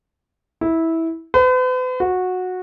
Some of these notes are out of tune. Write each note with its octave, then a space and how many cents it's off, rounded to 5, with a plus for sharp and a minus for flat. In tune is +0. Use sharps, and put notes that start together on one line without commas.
E4 -15
B4 +45
F#4 -15